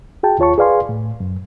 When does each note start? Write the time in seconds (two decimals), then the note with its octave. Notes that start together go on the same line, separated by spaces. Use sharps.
0.23 F#4 G#4 G5 A5
0.39 D#2 F4 C#5 A5 C#6
0.58 G#4 B4 D5 F5 G#5 C6
0.89 A2
1.20 F#2